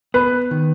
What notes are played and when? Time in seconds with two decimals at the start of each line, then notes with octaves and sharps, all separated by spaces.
0.14 B3 B4
0.51 D#3